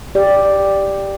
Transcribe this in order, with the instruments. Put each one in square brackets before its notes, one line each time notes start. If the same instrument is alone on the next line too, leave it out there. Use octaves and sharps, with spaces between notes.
[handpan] G4 D5